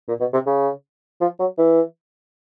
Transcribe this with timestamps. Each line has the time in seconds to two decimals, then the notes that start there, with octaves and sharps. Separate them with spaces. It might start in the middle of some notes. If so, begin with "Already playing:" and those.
0.08 A#2
0.20 B2
0.33 C3
0.46 C#3
1.21 F3
1.40 F#3
1.58 E3